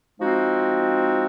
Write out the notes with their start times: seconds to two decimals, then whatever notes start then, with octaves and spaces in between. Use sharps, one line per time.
0.20 F3 G#3 C4 D#4 F#4